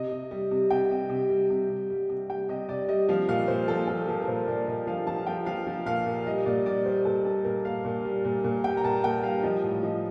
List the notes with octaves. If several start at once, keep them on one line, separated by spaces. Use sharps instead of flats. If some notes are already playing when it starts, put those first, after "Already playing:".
Already playing: C3 D#5
C3
G3
C3
C3 G5
C3
C3
G3
C3
C3
G3
C3
G3 G5
C3 D#5
C3 D5
G3 D#5
F3 F5
A#2 F5
A#2 C5
F3 A4
F3 A4
F3 A#4
A#4
A#2 C5
A#2 D5
A#2 D#5
F3 F5
F3 A5
F3 G5
F3 F5
F3
A#2 F5
A#2
G3 D#5
A#2 D5
G3 D5
G3 C5
A#2 A4
G3 A4
A#2 A#4
A#2 F5
A#2
G3
A#2
A#2
G3 G5
A#5
A#2 A5
A#2 G5
G3 F5
F3 D#5
A2
F3 D#5